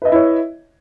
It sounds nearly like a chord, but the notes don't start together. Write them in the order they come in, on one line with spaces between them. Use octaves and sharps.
B4 D#5 E5 E4 C#5